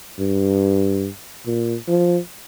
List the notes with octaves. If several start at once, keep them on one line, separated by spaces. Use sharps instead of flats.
G2
A#2
F3